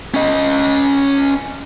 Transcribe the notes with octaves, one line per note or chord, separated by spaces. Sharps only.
C#4 D#5